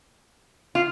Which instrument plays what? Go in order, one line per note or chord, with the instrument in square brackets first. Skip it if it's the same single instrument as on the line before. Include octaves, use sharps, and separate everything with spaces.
[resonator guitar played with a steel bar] F4